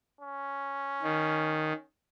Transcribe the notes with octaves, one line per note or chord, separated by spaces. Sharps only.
C#4
D#3